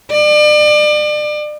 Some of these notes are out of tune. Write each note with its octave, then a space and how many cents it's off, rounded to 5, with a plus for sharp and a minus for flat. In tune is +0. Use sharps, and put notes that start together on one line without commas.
D5 +35